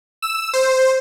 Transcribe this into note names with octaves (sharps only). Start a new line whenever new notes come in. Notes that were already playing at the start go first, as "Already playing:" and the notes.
E6
C5